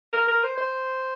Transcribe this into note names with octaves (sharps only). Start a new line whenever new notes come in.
A#4
A#4
C5
C5